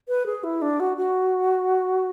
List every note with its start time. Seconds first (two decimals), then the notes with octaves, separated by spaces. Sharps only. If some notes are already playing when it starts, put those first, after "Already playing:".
0.08 B4
0.26 G#4
0.44 E4
0.62 D4
0.80 F#4
0.97 F#4